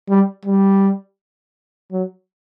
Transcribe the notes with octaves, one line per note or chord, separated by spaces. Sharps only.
G3
G3
F#3